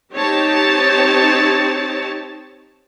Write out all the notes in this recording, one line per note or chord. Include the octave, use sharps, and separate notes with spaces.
C4 D#4 G4 C#5 A5